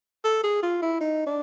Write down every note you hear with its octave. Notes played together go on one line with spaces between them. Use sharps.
A4
G#4
F4
E4
D#4
D4